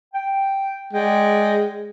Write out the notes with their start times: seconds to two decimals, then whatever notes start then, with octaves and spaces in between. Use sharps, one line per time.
0.14 G5
0.93 G#3 D5 F#5 G5